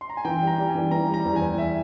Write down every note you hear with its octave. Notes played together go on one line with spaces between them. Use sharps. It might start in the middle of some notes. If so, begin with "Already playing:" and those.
C6
A#5
G#5
E3 G5
G3
A#5
G3
G#5
E3
E3 A#5
G3
A#5
E2
G#5
E2
E5